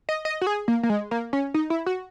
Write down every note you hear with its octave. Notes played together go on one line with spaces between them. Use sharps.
D#5
D#5
F#4
G#4
A#3
A#3
G#3
A#3
C#4
D#4
E4
F#4